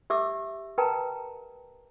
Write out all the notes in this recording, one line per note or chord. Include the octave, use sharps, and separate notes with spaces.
G4 E5 D6 E6
A#4 B4 G5 A5 A#5